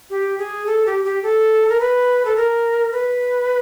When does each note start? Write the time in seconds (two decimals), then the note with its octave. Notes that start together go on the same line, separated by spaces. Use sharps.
0.10 G4
0.39 G#4
0.66 A4
0.86 G4
1.05 G4
1.23 A4
1.69 A#4
1.80 B4
2.25 A4
2.36 A#4
2.92 B4